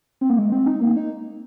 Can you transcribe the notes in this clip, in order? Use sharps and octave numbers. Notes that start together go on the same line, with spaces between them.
C4
A#3
G#3
C4
D#4
A#3
D#4